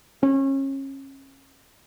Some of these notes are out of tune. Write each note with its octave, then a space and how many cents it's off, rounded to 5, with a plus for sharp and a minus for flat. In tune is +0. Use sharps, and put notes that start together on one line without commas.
C#4 -30